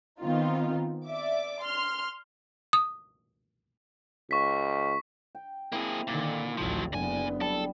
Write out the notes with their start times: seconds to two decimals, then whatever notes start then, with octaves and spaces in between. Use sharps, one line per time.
0.20 D#3 B3 C4 D#4 F4
1.05 D5 E5 D6
1.62 C6 F6
2.73 D#6
4.31 C#2 C#6 B6
5.35 G5
5.72 A#3 C4 E4 G#4 D#5
6.07 A#2 D3 D#3
6.57 A1 D2 F3 F#3
6.93 F#1 A#2 D3 B3 G#5
7.41 G3 A4